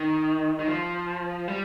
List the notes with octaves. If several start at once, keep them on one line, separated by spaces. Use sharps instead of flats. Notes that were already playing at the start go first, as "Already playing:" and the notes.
Already playing: D#3
D#3
F3
G3